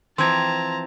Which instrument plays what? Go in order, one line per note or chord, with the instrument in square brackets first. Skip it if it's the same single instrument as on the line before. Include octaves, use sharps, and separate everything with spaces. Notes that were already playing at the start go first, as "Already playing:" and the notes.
[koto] E3 F3 C4 [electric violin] A5 A#5 [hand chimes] C6 G#6